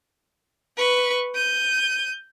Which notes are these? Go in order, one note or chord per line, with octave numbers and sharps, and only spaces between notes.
B4 C#6
G6 D#7